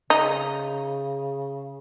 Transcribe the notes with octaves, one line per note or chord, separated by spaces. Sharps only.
C#3 D#4